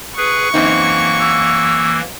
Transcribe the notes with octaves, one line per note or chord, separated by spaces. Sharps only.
G#4 B4 C#6
F#2 E3 A#3 C4 D#4
E6